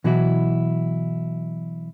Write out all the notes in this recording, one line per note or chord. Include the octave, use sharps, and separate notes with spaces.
B2 E3 F#3 E4 F#4